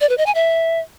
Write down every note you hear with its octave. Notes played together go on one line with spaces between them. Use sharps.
D5
B4
D#5
G#5
E5